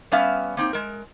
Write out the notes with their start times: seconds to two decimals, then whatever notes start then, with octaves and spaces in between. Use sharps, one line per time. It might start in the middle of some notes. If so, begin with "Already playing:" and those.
0.12 G3 B3 C#4 E5 F5
0.57 A#3 C4 D#4
0.73 G#3 A#4